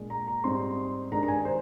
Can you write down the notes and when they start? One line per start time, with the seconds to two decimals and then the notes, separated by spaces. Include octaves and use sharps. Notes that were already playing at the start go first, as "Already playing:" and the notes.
Already playing: A#2 G#3 D4
0.10 A#5
0.27 A#5
0.44 G#2 G3 C4 D#4 C6
1.11 G2 D#3 G#3 D4 A#5
1.23 A#5
1.28 G#5
1.45 C5